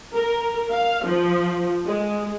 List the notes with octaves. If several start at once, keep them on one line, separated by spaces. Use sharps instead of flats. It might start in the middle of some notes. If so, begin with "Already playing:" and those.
A#4
F5
F3
G#3